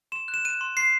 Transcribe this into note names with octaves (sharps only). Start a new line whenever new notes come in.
C6 E7
F#6
E7
F#6 D#7
C6
C6 C7